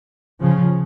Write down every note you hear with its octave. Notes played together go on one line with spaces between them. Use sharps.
C#3 F3